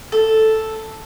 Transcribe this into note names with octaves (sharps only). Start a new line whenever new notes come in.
A4